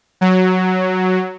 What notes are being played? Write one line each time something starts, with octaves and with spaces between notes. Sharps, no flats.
F#3